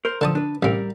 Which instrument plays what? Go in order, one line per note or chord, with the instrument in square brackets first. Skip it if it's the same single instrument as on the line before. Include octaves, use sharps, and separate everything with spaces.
[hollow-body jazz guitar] A#4 C5
[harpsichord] D3 A5 D#6 [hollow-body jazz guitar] F3 A4
[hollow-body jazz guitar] D4 B4
[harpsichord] A1 C3 [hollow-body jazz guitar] G3 A#4